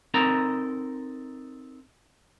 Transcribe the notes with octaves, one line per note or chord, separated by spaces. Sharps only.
C4 D#4 A4 A#4 A#5